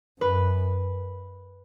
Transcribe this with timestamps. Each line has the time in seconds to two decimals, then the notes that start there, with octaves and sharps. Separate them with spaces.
0.21 F#2 B4